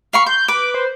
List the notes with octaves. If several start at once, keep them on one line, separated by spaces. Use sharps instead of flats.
F5 B5 C#6 C7
C6 G6
B4 D6
C5